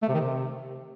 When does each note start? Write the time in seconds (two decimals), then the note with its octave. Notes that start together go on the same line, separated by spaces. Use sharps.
0.03 A3
0.09 C3
0.15 D#3
0.20 C3